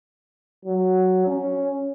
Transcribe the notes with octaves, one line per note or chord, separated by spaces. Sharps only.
F#3
C#4